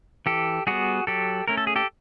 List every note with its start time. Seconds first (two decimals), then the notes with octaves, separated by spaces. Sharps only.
0.26 E3 G4 A4
0.67 G3 B3 F#4 G#4
1.07 F#3 G4 A4
1.48 A3 C#4 A#4
1.57 A4
1.67 G#4
1.76 G4 A4